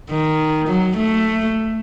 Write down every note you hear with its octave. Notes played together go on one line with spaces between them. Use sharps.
D#3
F#3
A3